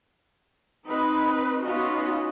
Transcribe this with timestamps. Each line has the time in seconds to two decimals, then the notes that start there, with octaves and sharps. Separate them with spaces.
0.87 C4 D#4 B4
1.63 B3 C#4 D#4 F4 F#4